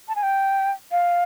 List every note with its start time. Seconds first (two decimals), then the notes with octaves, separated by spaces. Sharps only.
0.08 A5
0.15 G#5
0.23 G5
0.91 F5